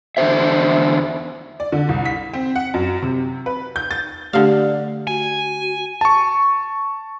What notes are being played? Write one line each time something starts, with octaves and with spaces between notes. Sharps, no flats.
E2 D3 C5 E5
D5
D3
C2
B6
C4
F#5
F#2
C3
B4
G6
A6
D3 A3 G4 D5 F5
F#4 G#5
A5 C#6